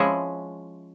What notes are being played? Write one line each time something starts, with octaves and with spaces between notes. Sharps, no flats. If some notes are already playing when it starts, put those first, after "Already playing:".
Already playing: F3 G#3 C#4 E4